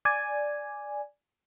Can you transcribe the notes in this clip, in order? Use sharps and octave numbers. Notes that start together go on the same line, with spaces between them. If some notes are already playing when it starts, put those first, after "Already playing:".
D5 G#5